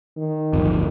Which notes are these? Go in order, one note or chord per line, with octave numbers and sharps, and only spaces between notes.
D#3
D1 G1 F2